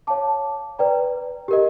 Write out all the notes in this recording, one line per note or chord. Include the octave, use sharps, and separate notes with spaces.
C#5 F5 A5 D6
B4 D5 G5 A#5
G4 A#4 D#5